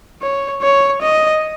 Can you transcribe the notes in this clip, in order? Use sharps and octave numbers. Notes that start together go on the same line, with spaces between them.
C#5
C#5
D#5